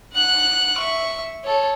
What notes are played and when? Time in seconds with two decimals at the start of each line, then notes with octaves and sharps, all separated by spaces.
0.14 F#5 F#6
0.78 E5 C#6
1.44 A4 C#5